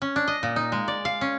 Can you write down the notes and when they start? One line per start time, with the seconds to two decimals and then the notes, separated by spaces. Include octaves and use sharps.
0.02 C#4
0.16 D4
0.28 D#5
0.43 A#2
0.56 D#4
0.72 G#3
0.88 D5
1.05 F5
1.21 C#4